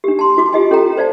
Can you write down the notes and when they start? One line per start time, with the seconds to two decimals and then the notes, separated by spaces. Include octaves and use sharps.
0.04 D4 G4
0.19 A5 C6
0.37 E4 F#4 D6
0.53 F4 G4 D#5 G#5
0.71 C#4 A4 G5 A#5
0.97 C5 D5 F5 A5